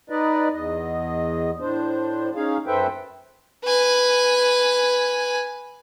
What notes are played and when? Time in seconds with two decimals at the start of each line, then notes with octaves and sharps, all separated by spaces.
0.10 D#4 B4 D5 D#5
0.53 E2 D#5
1.60 A2 D4 C5
2.36 C#4 D#4 G#4 F5
2.67 F#2 A4 B4 C5 E5 G5
3.65 B4 G#5